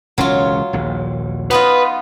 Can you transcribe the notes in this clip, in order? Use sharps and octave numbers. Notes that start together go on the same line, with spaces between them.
E1 C#2 F#3 C#4 F4
A#1 D#2
B3 D#4 F4 B4